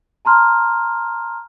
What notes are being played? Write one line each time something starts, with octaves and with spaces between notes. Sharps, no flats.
A5 A#5 C6 F6